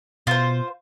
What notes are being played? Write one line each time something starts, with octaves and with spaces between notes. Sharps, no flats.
B2 F4 C5